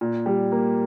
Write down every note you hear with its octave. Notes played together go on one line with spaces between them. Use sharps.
A#2
G3
A#3